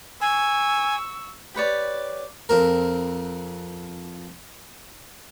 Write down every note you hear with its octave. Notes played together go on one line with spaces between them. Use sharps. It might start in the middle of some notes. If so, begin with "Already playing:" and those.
G#5 C#6 E6
G4 B4 C#5 D5
F2 C4 A#4